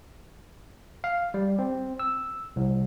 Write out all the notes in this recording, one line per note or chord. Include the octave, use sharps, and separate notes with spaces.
F5
G3
C4
E6
C2